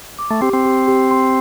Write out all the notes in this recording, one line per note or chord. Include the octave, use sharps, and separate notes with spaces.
D6
A3
C4 G4
C4
G4
G4
C6